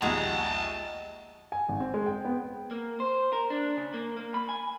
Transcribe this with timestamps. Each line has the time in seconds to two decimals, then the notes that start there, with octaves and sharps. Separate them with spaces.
0.02 A#1 D#2 G#3 F#4 G#4 A5 A#5
1.52 G#5
1.69 G#1
1.80 C4
1.94 G#3
2.06 G5
2.25 B3
2.71 A#3
3.00 C5
3.33 A#4
3.50 D4
3.77 C#3
3.94 A#3
4.17 A#3
4.34 B5
4.49 G#5